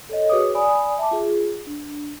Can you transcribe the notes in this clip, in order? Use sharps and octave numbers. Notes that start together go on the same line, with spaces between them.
A4 C#5 D#5
F#4 G#4 B4 C#5 D6 D#6
D5 G#5 B5 D#6
E5 A5 D6
F4 G#4
D4